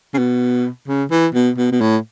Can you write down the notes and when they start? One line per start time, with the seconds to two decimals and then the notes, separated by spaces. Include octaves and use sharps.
0.14 C#3
0.18 B2
0.88 C#3
1.11 E3
1.34 B2
1.58 B2
1.72 B2
1.81 A2